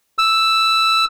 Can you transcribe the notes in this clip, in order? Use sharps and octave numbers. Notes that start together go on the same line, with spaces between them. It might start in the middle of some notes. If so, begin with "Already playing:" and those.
E6